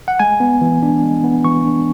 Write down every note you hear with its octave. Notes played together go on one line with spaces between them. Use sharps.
F#5
G#3 G#5
B3
E3
D4
G#3
B3
E3 C#6
D4